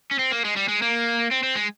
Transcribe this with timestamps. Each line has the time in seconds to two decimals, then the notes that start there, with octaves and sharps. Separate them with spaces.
0.11 C#4
0.19 C4
0.32 A#3
0.45 G#3
0.56 G3
0.68 G#3
0.82 A#3
1.31 C4
1.43 C4
1.55 G#3